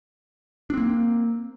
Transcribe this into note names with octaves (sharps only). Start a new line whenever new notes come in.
A#3 C4 D4